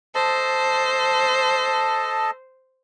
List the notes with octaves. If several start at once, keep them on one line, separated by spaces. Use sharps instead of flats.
A4 C5 D#5 A5